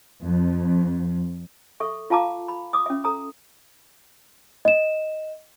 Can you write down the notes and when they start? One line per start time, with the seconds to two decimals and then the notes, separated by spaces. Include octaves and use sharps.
0.22 F2
1.80 A4 E5 C#6
2.10 F4 F5 A5 A#5 D6
2.48 B5
2.73 D6 D#6
2.86 C#4 E5
3.04 A4 A#5 D#6
4.65 D#5 E7